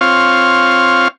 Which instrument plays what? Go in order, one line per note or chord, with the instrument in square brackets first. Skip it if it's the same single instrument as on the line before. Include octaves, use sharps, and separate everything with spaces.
[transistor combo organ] C4 F4 C#5 F5